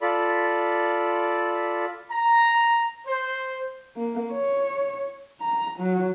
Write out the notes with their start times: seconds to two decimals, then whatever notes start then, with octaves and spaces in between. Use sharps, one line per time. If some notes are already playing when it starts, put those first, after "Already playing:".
0.02 F4 A4 D5 B5
2.10 A#5
3.06 C5
3.97 A#3
4.33 C#5
5.42 A#5
5.79 F#3